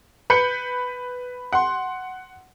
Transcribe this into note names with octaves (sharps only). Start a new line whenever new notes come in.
B4 B5 G6 C#7
F#5 C6